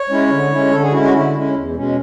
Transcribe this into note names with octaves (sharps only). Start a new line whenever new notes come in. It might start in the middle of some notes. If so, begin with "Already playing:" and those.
Already playing: C#5
G#3 C#4 E4
D3
G#3 C#4 E4
D3 A4
G#4
G#3 C#4 E4 F#4
F#4
D3 E4
G#3 C#4 E4
E2
B2 G#3 C#4